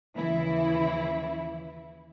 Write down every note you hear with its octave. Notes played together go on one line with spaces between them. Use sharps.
D#2 C#3 E3 F3 E4